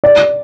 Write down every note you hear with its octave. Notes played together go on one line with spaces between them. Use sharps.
D5